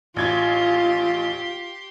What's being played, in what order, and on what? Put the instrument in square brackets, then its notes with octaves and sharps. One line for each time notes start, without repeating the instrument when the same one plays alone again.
[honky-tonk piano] A1 G#6 A6 [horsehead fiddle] F4 [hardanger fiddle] G4 C6